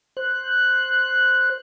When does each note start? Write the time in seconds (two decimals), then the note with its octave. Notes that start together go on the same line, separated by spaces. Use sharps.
0.17 C5 F#6